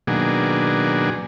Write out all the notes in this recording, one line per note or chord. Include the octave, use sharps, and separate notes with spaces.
B2 D#3 F#3 A#3 D4 G#4